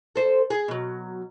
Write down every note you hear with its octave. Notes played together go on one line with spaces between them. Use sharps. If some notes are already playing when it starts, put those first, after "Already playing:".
A4 C5
G#4
B2 F#3